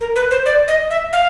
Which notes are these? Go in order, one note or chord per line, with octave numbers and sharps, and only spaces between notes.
A#4
B4
C5
D5
D#5
E5
F5